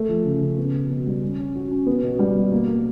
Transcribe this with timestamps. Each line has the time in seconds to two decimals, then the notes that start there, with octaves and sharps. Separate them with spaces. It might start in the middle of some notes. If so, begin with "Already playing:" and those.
Already playing: A3
0.09 F3
0.25 C#3
0.41 C#3
0.58 B3
0.74 B2
0.90 B2
1.06 G3
1.23 C#4
1.38 C#4
1.55 F#4
1.71 C#4
1.86 B3
2.03 B2
2.19 G3
2.35 B2
2.52 A#3
2.68 A#3